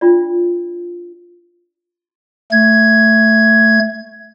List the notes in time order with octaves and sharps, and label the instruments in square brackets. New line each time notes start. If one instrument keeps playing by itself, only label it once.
[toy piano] D4 F4 D5
[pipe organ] A3 G#6